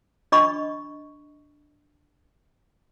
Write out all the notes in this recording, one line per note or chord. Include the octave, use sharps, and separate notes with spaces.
D4 D#5 B5 C#6